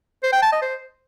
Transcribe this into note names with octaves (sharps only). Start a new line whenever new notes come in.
C5
G5
A5
D#5
C5